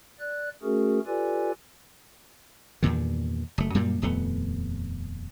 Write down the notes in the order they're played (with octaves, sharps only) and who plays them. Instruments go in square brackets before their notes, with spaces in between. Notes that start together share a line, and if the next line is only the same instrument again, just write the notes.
[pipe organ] D5 F#6
A3 C#4 F#4 G#4 A#4
F4 G4 A4 B4 D5 G#5
[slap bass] E2 G2 A#2 D#3
F#1 A3
F#2 A#2 G3 A#3
D#1 F2 A3 B3